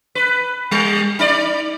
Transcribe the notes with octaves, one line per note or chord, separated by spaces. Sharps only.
B4
G3
D#4 D5